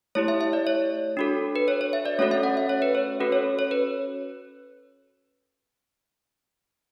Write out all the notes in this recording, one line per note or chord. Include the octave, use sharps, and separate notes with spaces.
A3 E4 G4 C#5
E5
E5
D5
C#5
D4 F#4 A4
B4
C#5
C#5
E5
D5
A3 C#4 F#4 A4 C#5
E5
F#5
E5
C#5
B4
C#5
C#4 F#4 A4 B4
C#5
C#5
B4